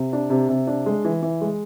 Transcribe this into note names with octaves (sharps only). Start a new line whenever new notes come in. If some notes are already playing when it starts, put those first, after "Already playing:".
Already playing: C3
D4
C3
C3
D4
G#3
E3
E3
G#3